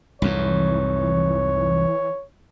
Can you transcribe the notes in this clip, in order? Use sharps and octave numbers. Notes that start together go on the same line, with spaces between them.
C2 F2 G#2 E3 C#5